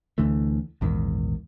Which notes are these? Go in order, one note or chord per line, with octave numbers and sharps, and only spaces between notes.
D2 D3 E3 A3
A#1 E2 G#2 D#3